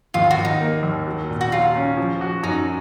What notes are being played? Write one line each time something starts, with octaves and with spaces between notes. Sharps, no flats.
D#2 F4
F#4
D#2
D#4
A#3
D#2
F#3
A#2
F#4
F#3 F4
C#4
F3
F#4
F#2 D#4